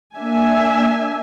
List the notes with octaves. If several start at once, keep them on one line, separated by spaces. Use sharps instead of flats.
A#3 D4 E5 G#5